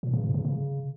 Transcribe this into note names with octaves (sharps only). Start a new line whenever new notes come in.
A#2
C#3
G#2
C#3
C#3